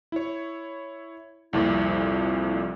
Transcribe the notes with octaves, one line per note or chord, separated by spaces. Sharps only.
E4 C#5
C2 F2 A#2 E4